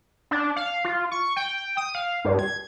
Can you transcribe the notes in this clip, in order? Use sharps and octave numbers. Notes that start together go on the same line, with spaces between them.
D4
F5
F4
C#6
G5
D#6
F5
G2
G#6